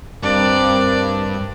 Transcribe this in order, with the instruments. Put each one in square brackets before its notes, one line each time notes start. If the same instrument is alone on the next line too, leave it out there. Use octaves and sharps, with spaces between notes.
[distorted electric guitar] G2 [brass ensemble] C4 A#4 [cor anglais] D4 [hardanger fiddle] D5